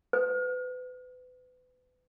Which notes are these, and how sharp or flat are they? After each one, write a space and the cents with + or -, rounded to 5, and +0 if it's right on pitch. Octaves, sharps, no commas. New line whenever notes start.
B4 +30